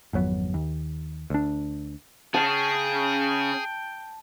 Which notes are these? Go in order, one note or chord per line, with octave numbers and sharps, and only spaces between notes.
G#1 F2 F#3 B3
D#2
D2 D4
C#3 C#4 G#4 G5 A5